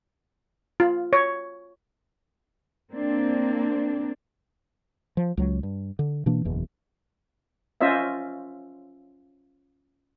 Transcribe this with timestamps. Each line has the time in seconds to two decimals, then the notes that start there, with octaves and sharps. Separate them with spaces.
0.80 F4
1.13 C#5
2.92 A#3 C4 D4
5.17 F3
5.37 C#2 F#3
5.63 G2
5.99 D3
6.26 B2 E3 A#3 D4
6.45 F#1 E2 B2
7.81 C#4 F4 C5 D#5 E5